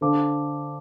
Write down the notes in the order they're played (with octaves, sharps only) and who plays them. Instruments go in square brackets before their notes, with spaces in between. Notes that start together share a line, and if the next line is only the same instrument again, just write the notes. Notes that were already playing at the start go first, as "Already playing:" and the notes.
[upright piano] D3 [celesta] A4 C5 F5 A5 D6